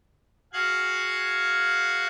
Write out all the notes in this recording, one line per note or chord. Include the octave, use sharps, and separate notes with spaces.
F#4 G#4 F5 F#6 G#6